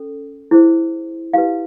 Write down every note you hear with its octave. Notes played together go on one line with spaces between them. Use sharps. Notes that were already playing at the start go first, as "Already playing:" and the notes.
Already playing: C#4 A4
E4 G#4 C5
E4 G4 B4 F5